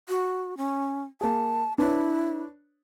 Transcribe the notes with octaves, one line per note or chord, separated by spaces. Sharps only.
F#4
C#4
A#3 G#4 A5
D4 E4 B4 C#5